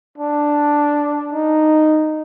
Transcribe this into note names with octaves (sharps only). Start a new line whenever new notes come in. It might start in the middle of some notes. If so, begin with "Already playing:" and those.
D4
D#4